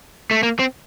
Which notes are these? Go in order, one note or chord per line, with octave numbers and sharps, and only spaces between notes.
A3
A#3
C4